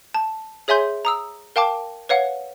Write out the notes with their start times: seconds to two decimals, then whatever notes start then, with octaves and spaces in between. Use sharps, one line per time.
0.14 A5
0.68 G#4 C#5 E5 G#5 C6 G6
1.05 A#5 D#6 E6
1.56 A#4 F5 G5 A5 D6
2.09 B4 C#5 F5 F#5